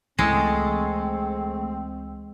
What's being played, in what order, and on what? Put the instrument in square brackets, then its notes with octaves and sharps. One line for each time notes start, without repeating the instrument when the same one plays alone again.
[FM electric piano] C#2 E3 E6 [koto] G#3 [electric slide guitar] A3 G#4 A4 [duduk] C4